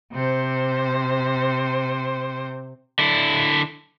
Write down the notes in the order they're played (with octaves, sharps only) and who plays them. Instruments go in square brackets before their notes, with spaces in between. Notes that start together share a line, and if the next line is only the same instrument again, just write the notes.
[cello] C3 C5
[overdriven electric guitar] D3 E4